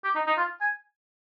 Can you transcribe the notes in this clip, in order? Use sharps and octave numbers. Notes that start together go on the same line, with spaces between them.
G4
D#4
D#4
F4
G#5